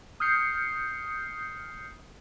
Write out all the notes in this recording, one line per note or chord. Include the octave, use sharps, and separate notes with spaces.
D#6 F6 G6 C7 C#7